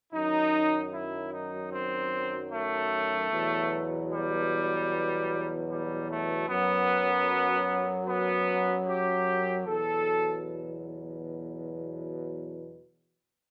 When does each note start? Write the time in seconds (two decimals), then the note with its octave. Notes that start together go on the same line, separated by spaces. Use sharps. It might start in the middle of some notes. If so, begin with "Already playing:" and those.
0.13 F#2 D#3 F#3 D#4
0.93 E4
1.32 D#4
1.72 C4
2.51 A3
3.31 E2 B2 F#3
4.10 G3
5.68 G3
6.08 A3
6.48 F#2 F#3 B3
8.07 B3
8.87 G4
9.65 E2 B2 F#3 A4